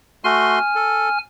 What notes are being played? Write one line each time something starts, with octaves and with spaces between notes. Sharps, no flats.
A3 F#4 G#5 C6 F6
A4